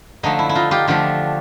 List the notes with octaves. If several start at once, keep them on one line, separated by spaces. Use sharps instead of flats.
D3 F3 A3 D#4
E4
E4
D#4 F4
F4 G4
D3 F3 A3 F4 G4